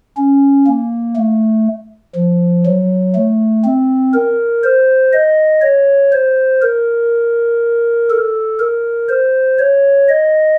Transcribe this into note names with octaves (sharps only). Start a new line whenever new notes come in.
C#4
A#3
A3
F3
F#3
A3
C4
A#4
C5
D#5
C#5
C5
A#4
A4
A#4
C5
C#5
D#5